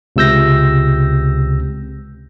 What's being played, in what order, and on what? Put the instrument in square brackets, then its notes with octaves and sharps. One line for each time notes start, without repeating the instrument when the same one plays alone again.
[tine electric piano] C#2 C3 E6 G6 A#6